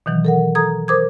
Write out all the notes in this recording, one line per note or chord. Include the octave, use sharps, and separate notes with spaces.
B2 D#3 E3 F#3
A4 A#4 F#5
A4 A#5 D#6 G#6
A#4 C5 D6 D#6 G#6